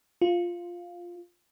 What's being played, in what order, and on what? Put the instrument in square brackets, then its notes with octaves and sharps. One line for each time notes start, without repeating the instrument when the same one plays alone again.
[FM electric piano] F4